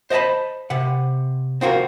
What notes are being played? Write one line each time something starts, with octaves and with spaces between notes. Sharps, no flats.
C5 D#5 F5 A5 B5
C3 F#5
C4 F4 F#4 A#4